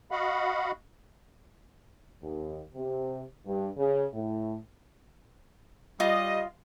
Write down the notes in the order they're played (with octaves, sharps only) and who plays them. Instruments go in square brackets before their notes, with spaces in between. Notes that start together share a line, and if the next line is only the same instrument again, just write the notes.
[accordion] F#4 D#5 F5 F#5 B5
[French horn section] D#2
C3
G2
C#3
A2
[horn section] G3 D#5 [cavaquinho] F4